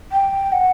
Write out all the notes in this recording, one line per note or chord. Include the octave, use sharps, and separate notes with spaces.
G5
F#5